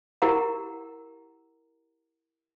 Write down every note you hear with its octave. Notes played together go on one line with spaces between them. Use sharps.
E4 G4 A#4 F#5 A#5